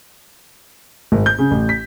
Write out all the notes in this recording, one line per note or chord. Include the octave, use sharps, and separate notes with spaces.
G#1
G6
C#3
A1
B6